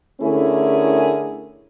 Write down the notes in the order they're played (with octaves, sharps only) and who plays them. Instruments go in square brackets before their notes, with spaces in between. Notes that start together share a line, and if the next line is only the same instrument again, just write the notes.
[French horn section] D3 A3 C#4 E4 G#4 A#4